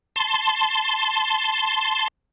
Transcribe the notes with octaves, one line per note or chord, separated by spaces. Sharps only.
A5 C6